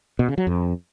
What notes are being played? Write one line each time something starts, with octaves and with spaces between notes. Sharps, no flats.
B2
C#3
F#3
F2